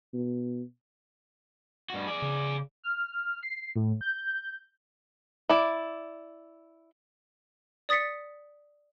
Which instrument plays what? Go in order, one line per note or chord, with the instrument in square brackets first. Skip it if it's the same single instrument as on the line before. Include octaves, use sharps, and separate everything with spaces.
[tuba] B2
[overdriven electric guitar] G2 F#4
G#4 D5
[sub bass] C#3
[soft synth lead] F6
C7
A2
G6
[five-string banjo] E4 D5
[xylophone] D5 D#6 A6 B6 C#7